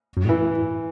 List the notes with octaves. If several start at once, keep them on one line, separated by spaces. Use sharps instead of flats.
F#2
A2
E3